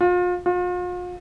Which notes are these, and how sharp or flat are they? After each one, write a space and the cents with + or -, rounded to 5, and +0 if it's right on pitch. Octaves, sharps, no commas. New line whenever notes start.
F4 +35
F4 +40